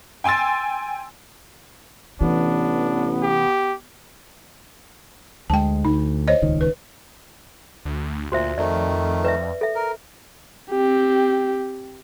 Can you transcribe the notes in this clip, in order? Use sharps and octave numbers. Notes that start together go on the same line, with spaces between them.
G5 G#5 C6 E6 A6
A1 C3 E3 B3 D4
G4
D2 G#3 G5 A5
D2 D#4
C5 C#5 D#5
D#1 C#2 D#3
B4
D2
D2 A#2 F#4 C5 E5
F2 D#3 A3 D5
B4 D5 E5
A4 E5
A#4
C4 G4